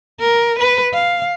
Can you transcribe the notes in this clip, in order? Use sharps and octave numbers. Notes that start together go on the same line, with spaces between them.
A#4
B4
F5